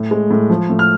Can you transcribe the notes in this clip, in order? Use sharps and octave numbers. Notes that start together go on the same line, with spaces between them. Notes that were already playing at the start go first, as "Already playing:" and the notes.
Already playing: A2
G#3
A2
F3
A2
F6